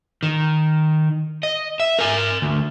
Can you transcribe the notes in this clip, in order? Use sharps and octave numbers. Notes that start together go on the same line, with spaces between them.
D#3
D#5
E5
A#4 G#5
D2